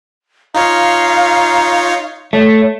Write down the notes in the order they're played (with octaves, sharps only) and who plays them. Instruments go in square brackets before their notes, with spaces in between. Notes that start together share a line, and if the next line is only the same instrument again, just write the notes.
[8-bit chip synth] D#4 F4 C#5 [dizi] F5 [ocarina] A#5
[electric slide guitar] A3 [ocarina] C#5